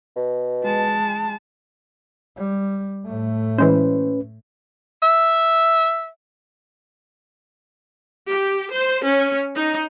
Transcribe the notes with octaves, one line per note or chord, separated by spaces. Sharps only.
B2
G#3 A5
G3
A2 A3
E3 G#3 C#4 B4 C5
E5
G4
C5
C#4
D#4